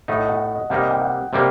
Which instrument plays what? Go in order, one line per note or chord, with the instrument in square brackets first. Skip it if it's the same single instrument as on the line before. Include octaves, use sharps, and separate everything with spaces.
[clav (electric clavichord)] A2 A3 D#4 [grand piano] F#5
[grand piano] D#5
F#5
F#5
D#5
[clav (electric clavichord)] C3 G3 A#3 D#4 [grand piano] F#5
[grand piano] D#5
G5
F#5
[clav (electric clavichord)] C3 G3 A#3